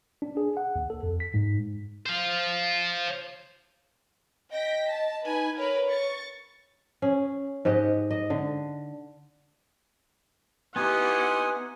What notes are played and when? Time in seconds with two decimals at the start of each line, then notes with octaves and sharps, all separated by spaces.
0.22 D4
0.37 G#4
0.57 F#5
0.76 D#2
0.90 A4
1.03 F2
1.20 B6
1.34 G#2
2.06 C5 F5
4.51 D#5 G5 A#6 B6
4.89 A5
5.26 D#4 B4 G#5
5.57 A#4 B4 C#5 B5
5.87 C#6 A6
7.02 C#4 G#4
7.65 G#2 G4 D#5 F#5
8.11 D#5
8.30 D3
10.76 B3 D#4 E4 G4 F#5 G#5 C6 D#6